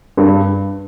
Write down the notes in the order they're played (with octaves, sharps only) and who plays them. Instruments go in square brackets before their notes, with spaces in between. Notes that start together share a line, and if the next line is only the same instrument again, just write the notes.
[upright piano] G2